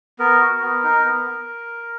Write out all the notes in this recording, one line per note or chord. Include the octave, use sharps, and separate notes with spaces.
B3 A#4
F#4
B3
D#4
B3